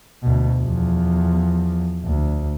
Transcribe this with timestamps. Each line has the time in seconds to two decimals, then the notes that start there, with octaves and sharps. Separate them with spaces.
0.23 D2 B2
0.58 E2 F3
2.04 D2